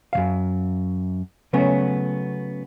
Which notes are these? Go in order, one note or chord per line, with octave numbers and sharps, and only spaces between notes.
F#2 C#3 F5
C#3 F#3 A3 B3 C#4